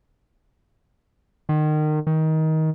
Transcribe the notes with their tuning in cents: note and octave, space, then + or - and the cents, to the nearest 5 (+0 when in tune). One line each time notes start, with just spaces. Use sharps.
D#3 -30
D#3 +20